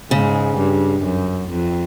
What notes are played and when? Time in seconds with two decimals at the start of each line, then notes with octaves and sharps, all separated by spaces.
0.11 G#2 C#3
0.57 G2
1.03 F#2
1.49 F2